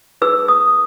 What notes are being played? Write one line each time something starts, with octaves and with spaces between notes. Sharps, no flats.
D#4 G#4 B4 E6
D#6